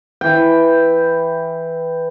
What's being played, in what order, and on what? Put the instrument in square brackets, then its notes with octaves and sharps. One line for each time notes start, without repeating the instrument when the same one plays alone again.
[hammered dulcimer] E3 G5